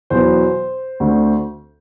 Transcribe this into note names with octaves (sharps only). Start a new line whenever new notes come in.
E2 B2 F#3 B3 C5
D2 D3 A3 C4